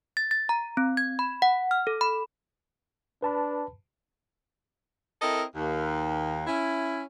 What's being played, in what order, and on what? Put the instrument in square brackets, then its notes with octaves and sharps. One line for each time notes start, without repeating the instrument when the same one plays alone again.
[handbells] A6
A6
A#5
C4
G#6
B5
F#5
F6
A4
B5
[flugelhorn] D4 [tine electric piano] B4 A5 B5
[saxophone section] C4 E4 A4 A#4 D#5
D#2
C#4 E4